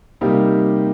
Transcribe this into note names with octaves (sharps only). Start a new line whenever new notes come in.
C3 G3 A#3 D#4 G4